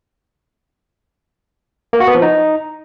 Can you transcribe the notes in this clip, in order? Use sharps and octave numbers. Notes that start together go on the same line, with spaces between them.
A#3
F#4
B3
F3
D#4